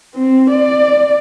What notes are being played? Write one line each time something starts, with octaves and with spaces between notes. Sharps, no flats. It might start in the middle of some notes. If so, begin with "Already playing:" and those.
C4
D5